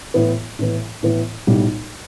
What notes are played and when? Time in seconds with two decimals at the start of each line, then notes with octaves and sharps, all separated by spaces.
0.14 A2 E3 B3
0.59 A2 E3 B3
1.03 A2 E3 B3
1.47 B1 A2 G3